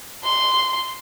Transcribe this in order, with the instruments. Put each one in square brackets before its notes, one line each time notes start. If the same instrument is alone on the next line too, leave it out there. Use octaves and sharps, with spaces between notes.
[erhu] C6